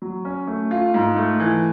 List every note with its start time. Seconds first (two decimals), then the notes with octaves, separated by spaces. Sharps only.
0.02 F#3
0.25 C#4
0.47 A3
0.71 F4
0.94 G#2
1.16 A3
1.40 E3